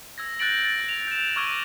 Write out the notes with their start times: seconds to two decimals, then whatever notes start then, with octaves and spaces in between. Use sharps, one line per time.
0.18 E6 G#6 A#6
0.39 F#6 G6 A6 A#6 D7 F#7
0.64 A6
0.89 F7
1.07 G6 E7
1.36 C#6 D6 E6 F6 G#6 D#7